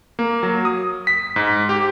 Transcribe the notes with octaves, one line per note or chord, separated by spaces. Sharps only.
A#3
F#3
D#6
B6
G#2
G4